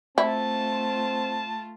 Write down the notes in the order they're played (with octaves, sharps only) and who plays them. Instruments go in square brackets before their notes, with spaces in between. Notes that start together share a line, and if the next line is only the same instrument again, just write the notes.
[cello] A3 F4 [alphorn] C4 [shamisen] E4 [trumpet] A5